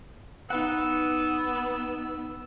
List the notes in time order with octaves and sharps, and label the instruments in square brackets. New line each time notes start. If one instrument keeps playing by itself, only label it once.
[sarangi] B3 [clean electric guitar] D#4 B4 F#5 [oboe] E6